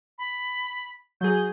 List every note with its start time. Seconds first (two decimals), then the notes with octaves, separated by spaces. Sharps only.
0.18 B5
1.21 F#3 G#4 G6